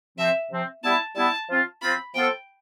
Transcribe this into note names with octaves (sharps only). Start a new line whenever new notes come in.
C3 F3 C4 E5
C3 F3 C4
G3 B3 E4 A5
G3 B3 E4 A5
F3 C4 F4
F3 C4 F4 B5
F3 B3 F4 A4 C5 G5